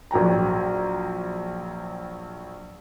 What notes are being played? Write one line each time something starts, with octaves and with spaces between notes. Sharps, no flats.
A#1 F#3 G5 A#5